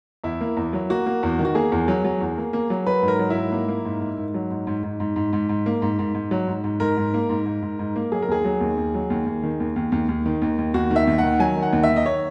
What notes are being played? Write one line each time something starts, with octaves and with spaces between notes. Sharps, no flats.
E2 E4
A#3
E2
F#3
A#3 F#4
A#3
E2
D#3
F#4
A#3 G#4
E2
F#3
F#3
E2
A#3
A#3
F#3
F#3 B4
G#2
A#4
F#3
E4
G#2
A#3
A#3
G#2
G#2
G#2
F#3
G#2
G#2
G#2
G#2
G#2
G#2
G#2
A#3
G#2
G#2
G#2
F#3
G#2
G#2
G#2 A#4
G#2
A#3
G#2
G#2
G#2
G#2
A#3
F#3 G#4
A#4
D#2 G#4
F#3
D#2
D#2
F#3
D#2
D#2
D#3
D#2
D#2
D#2
D#2
D#3
D#2
D#2
D#2 F#4
D#3
E5
D#2
D#3 F#5
F#3 G#5
D#3
F#5
D#2
E5
D#3
D#5
C#5